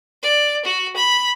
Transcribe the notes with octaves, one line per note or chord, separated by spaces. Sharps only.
D5
F#4
B5